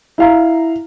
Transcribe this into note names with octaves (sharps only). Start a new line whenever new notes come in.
E4 F5 A#5